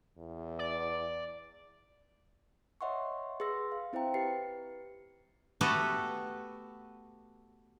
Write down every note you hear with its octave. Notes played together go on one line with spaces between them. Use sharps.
E2
D5
C#5 D#5 E5 F#5 C6 C#6
G#4 B4 C6 E6 A#6
F5
C4 E4 C5 E5 G5 A#5
G4 B4 A6 C7 C#7
A3 B3 F#4 G4 A4 B4